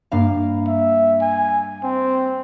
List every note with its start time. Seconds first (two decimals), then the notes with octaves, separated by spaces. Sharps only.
0.12 G2 A#3 F5
0.67 E5
1.22 G#5
1.83 C4